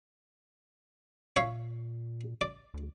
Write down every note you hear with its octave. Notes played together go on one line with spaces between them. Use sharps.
A#2 C#5 E5 F5
D5
D2